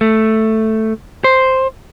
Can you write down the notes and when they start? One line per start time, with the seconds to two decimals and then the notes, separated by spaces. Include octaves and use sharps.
0.01 A3
1.24 C5